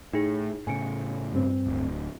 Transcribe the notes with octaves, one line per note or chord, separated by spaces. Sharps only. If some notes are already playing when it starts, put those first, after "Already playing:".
A2 D#4 G#4
A2 C#3 G#5 C#7 D7
G2 C4
D1